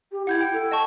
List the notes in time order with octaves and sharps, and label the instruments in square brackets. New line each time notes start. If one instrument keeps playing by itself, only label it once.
[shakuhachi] G4
[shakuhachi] E4 [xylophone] F#5 G6 G#6
[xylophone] G5
[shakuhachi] A4
[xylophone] D#5 A5 C#6